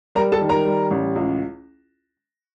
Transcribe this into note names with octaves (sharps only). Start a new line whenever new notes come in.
G3 A#4 A#5
A4 A5
D#3
A#4 A#5
G3
A1
C#2